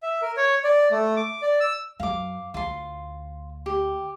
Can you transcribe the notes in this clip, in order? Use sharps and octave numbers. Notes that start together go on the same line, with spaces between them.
E5
A#4
C#5
D5
A3
D6
D5
E6
F#2 F5 D6
D2 F4 C6
G4